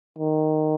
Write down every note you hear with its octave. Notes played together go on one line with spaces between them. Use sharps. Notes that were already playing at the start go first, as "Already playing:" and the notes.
D#3